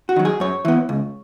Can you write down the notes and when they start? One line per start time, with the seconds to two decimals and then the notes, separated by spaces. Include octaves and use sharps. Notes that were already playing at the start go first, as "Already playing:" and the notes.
0.09 F#4
0.16 D#3 F#3
0.25 G#4
0.40 F#2 C#5
0.65 E3 B3
0.89 C#2